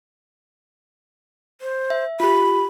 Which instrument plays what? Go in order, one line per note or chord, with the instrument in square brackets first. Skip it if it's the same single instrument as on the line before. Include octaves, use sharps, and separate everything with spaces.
[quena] C5
[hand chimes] E5
[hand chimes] F4 G4 [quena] B5